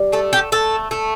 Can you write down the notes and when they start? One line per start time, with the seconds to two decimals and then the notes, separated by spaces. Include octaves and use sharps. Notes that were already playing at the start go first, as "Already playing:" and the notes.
Already playing: G3
0.12 A3 A4
0.33 G4
0.52 A3 A4
0.91 A3